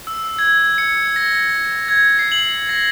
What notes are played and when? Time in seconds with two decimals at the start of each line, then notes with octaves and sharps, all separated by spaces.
0.07 E6
0.39 G#6
0.78 C#7
1.16 A#6
1.88 G#6
2.19 C7
2.32 F#7
2.69 A#6